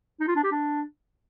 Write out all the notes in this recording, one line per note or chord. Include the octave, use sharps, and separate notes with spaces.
D#4
F4
D4
G4
D4